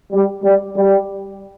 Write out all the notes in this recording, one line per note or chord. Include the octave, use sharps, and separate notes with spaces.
G3
G3
G3